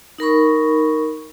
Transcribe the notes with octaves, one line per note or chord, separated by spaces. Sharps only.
D#4 A#4 B5 C#6